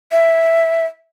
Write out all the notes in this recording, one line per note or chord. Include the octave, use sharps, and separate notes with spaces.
E5